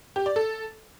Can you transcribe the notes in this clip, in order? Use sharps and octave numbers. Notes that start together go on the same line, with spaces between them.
G4
D5
A4